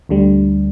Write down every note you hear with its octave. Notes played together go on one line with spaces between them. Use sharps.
D2 D3 G3